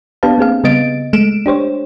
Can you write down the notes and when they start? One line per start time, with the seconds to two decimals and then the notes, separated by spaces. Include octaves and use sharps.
0.23 B3 D4 G4 B4 F5 A5
0.38 A#3 C4 G#4 F5
0.64 C#3 G3 B3 D#5 A6 D7
1.13 G#3 A3 D7 E7
1.46 D4 G4 C5 C#5